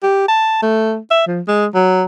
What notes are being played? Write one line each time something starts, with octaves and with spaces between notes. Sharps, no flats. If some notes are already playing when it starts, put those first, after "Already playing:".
G4
A5
A3
E5
F3
G#3
F#3